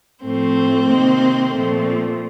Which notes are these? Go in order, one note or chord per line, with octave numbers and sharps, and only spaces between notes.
A2 F3 A3 C4
C3 D#3 A#3
A#2 F3 A3